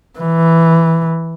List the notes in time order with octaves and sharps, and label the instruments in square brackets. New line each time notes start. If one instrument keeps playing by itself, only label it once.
[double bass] E3